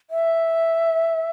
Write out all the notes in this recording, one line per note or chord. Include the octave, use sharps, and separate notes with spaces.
E5